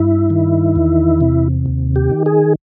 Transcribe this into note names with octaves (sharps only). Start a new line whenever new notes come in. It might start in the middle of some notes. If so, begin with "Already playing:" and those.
Already playing: G2 E4
D#3
E2
C3
D#2
G4
D#3
G#4